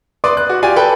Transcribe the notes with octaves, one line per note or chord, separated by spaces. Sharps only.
B4 D5 C6 D6 D#6
F#6
F#4
F4 G4 D5 G#5
A4 B4 G5 B5